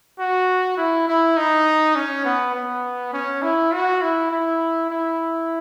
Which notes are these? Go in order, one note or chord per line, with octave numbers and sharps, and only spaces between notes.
F#4
E4
E4
D#4
C#4
B3
B3
C#4
E4
F#4
E4
E4
E4